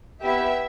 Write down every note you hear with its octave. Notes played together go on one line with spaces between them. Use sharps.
B3 E4 G4 E5